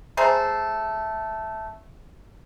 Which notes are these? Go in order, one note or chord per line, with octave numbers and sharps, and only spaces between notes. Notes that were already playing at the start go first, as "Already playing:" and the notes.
A3 G#4 C5 A#5